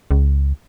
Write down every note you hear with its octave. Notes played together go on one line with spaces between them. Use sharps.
C#2